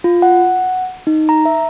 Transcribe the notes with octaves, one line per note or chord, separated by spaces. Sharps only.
F4
F#5
D#4
A#5
E5